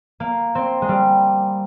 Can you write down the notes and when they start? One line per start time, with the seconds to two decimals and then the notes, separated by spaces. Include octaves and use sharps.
0.20 A#3
0.55 C4
0.82 G#3
0.89 G3